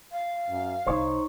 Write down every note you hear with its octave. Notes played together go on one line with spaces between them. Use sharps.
F5
F#2
C2 D#4 C5 C#5